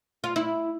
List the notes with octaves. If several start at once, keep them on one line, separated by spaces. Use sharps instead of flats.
F4
E4